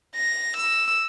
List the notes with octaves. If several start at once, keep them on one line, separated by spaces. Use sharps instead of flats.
A#6
E6